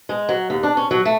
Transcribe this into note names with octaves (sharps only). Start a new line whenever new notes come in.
G#3
F#3
D#2
D4
C#4
F#3
A3